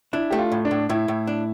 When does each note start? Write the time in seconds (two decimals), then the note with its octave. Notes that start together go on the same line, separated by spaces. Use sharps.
0.13 D4 E4
0.30 A3 G4
0.39 F4
0.52 A2
0.65 D4
0.71 A2
0.89 A2 E4
1.08 A2
1.27 D4